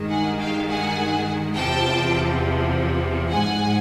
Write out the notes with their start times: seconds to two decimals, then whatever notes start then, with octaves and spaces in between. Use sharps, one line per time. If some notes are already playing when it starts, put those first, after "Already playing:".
Already playing: G2 D#3 G#3
0.09 F#5 G#5
0.39 F5 G5
0.68 F#5 G#5
1.55 E2 C3 F3 G5 A5
3.30 G#2 F3 G#3 F#5 G#5